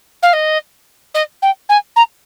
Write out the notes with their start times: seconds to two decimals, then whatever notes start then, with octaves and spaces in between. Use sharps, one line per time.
0.23 F5
0.33 D#5
1.15 D#5
1.42 G5
1.69 G#5
1.96 A#5